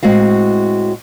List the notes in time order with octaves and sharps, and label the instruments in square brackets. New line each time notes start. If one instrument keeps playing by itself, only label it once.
[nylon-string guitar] A2 G#3 C4 F#4 F5